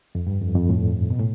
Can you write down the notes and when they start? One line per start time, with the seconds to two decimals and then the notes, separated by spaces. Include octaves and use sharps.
0.15 F2
0.27 G2
0.41 F2
0.55 F2
0.69 A2
1.10 B2
1.19 A2